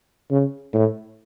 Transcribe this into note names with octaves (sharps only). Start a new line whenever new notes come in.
C#3
A2